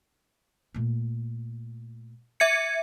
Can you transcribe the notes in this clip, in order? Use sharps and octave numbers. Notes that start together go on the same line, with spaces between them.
A#2 A3
E5 G#6 C#7